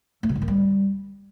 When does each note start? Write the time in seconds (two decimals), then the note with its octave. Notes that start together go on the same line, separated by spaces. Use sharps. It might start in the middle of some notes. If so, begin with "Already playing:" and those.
0.23 A3
0.29 B2
0.35 G#2
0.42 D#3
0.48 G3